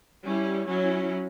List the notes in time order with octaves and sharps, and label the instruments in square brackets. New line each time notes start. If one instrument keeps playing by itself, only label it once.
[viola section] G3 C#4 E4
F#3 C#4 E4